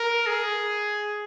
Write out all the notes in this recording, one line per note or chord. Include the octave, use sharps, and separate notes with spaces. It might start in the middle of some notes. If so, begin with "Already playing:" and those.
Already playing: A#4
G#4